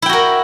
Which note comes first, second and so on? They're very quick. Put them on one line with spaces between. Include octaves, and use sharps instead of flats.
E4 G5 F#4 A#4